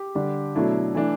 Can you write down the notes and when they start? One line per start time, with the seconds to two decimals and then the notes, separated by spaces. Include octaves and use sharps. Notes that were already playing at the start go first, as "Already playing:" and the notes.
Already playing: G4
0.15 D3 G3 D4
0.55 B2 F#3 A3 D4 E4
0.94 E3 A3 D4